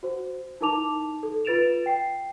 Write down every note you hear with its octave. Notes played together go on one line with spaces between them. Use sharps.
F#4 C5
D#4 E4 A#4 A5 D6 F7
A4
F4 B4 A6 D7 E7 F7
G5 C7